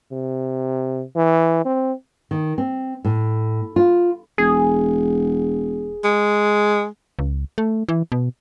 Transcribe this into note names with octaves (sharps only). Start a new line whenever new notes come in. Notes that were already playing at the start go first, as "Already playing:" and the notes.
C3
E3
C4
D#3
C4
A2
F4
E1 G#4
G#3
C#2
A3
E3
B2